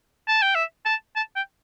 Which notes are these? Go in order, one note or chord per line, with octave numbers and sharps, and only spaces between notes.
A5
G5
E5
A5
A5
G5